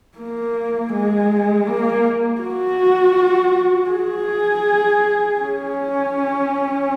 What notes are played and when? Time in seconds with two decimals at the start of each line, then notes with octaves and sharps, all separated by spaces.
0.18 A#3
0.93 G#3
1.67 A#3
2.41 F#4
3.91 G#4
5.40 C#4